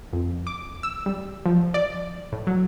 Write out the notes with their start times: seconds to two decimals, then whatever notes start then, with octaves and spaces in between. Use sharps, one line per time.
0.13 F2
0.47 D6
0.83 E6
1.06 G3
1.46 F3
1.74 D5
2.32 A2
2.47 F#3